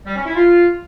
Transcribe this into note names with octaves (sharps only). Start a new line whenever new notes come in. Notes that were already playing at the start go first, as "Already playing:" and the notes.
G3
C#4
E4
F4